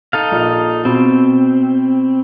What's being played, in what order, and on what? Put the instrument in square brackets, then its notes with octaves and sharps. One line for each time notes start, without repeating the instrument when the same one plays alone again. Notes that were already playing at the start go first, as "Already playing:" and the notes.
[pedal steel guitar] D#4 A4 F5
[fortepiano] A#1
[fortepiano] B2 [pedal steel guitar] C4